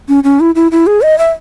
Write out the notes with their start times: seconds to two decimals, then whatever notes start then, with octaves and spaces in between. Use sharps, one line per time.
0.09 C#4
0.24 C#4
0.40 E4
0.55 E4
0.72 E4
0.87 G#4
1.02 D#5
1.18 E5